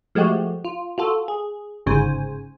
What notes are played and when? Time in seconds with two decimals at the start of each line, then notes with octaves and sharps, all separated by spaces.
0.15 F3 G#3 A3 F#4 G4
0.64 F4
0.98 F4 F#4 A4
1.28 G#4
1.86 G1 G#2 C#3 C5 G#5